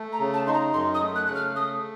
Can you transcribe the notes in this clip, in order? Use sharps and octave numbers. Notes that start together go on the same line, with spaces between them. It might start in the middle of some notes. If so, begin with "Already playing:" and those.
Already playing: A3
A#5
C#3
A5
D#4 C6
A#5
F#2 C6
D#6
A3
F#6
C#3 F#6
F6
A3 D#6